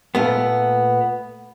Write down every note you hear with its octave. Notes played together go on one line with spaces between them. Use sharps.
A#2 A3 B3